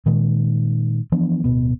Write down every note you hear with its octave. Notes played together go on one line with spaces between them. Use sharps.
A#2 D#3 G#3
E3 F3 B3 D4
D1 B2 B3